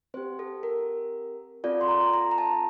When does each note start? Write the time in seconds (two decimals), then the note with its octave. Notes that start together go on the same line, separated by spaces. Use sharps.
0.14 C4 G4 C5
0.39 A4
0.63 A#4
1.64 C4 F4 A4 D5
1.81 C6
1.88 A#5
2.13 A#5
2.31 A#5
2.38 A5